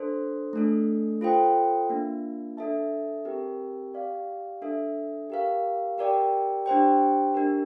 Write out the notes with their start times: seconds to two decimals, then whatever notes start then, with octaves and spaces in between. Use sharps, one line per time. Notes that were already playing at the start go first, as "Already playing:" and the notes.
Already playing: D4 A4 C5
0.53 A3 D4 A4
1.21 F4 A4 C5 G5
1.90 A#3 D4 F4
2.57 D4 A4 E5 A5
3.25 C4 G4 A#4
3.93 G4 D5 F5
4.62 D4 A4 E5
5.30 G4 A#4 F5
5.98 G4 A#4 D5 G5
6.66 D4 G4 C5 G5
7.34 D4 G4 A#4